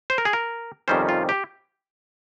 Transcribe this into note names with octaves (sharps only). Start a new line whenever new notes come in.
C5
A#4
G#4
A#4
F2 C3 D#3 G3 C#4 C5
F4
G4